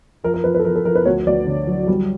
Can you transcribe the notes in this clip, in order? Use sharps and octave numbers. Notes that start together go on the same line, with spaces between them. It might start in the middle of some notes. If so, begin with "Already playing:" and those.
F3 A#4
A#4
F3 B4
B4
A4
F3 A#4
A4
F3 A#4
B4
D2 C#5
D2 D5
D3
F#3
G3